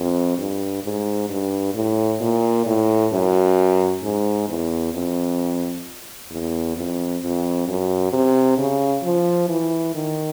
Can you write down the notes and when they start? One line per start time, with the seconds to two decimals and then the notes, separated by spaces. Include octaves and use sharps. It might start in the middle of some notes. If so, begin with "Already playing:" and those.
Already playing: F2
0.38 G2
0.84 G#2
1.29 G2
1.75 A2
2.21 A#2
2.66 A2
3.12 F#2
4.03 G#2
4.49 E2
4.94 F2
6.30 E2
6.76 F2
7.22 F2
7.68 F#2
8.13 C3
8.58 C#3
9.04 F3
9.49 E3
9.95 D#3